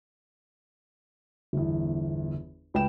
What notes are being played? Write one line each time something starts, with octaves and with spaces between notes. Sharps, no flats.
G1 E2
C#2 B4 G5 E7